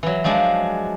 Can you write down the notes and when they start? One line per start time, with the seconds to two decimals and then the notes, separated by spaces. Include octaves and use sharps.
0.03 E3 F#3
0.24 F3 F#3 G#3 D4